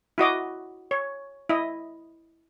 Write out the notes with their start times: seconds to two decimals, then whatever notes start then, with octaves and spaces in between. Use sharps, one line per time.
0.18 E4 F#4 D#5 D6
0.91 C#5
1.49 E4 D#5